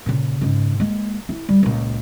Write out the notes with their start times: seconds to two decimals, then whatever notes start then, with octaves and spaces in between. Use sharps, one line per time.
0.06 A#2 C#3
0.41 G#2 C#3
0.80 G#3 A#3
1.29 E4
1.49 G3
1.63 C#2 A#2